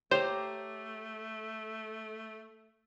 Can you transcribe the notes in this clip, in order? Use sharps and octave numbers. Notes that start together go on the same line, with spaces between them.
A3 G4 C5 C#5 A#5